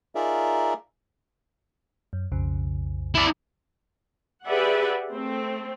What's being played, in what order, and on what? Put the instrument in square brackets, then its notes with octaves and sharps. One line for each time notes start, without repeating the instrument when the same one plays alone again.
[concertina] D#4 F4 G#4 A#4 D5 E5
[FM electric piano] F#2
B1 F2 C#3
[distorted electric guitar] E4 D5
[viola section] G4 G#4 B4 D5 E5 F#5
A3 C4